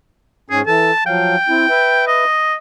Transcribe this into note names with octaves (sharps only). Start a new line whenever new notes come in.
G#2 C#4 G#4
E3 A4 A5
F3 F#3 F5 G5
C4 E4
B4 E5
D#5